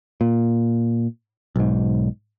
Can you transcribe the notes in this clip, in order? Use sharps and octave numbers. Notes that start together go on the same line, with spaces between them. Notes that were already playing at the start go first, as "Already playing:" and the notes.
A#2
B1 G#2